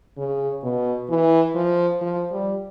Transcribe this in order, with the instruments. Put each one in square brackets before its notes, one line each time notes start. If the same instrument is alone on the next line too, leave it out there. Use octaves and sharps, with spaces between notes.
[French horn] C#3
B2
E3
F3
F3
G3